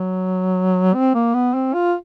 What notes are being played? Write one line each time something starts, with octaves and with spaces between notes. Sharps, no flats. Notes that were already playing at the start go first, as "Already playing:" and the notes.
Already playing: F#3
C4
A#3
B3
C4
F4